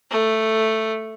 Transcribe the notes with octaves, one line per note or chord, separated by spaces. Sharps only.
A3